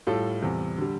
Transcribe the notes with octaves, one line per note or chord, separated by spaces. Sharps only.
A2 G3 F4 A4
E2 C3 G3
D3 G3